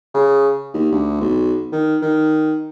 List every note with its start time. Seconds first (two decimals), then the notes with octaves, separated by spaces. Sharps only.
0.15 C#3
0.74 D#2
0.92 D2
1.21 B1
1.72 D#3
2.02 D#3